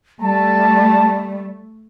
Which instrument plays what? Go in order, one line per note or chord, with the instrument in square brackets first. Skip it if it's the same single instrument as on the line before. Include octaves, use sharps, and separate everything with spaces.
[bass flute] G3 [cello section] A3 [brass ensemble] A5